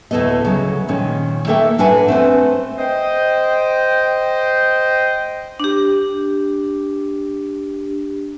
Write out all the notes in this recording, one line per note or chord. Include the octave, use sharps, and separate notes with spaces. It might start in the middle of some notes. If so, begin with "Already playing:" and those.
D2 A2 G#3 A3 B3 D#5
C#3 F#3
A#2 D#3 C#4
A3 A#3 A4 A#4 E5 G5
A2 D4 B4 F#5 G#5
A3 C4 B4
C5 D#5 G5
D4 G4